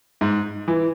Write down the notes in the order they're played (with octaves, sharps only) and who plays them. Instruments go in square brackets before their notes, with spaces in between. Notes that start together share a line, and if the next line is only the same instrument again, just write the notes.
[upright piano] G#2
E3